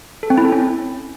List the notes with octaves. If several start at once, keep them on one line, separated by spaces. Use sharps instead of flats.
A4
C4
E4
A4
C#4